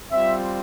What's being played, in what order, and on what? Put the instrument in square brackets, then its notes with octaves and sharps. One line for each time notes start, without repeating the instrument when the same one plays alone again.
[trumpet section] G3 C4 F4 E5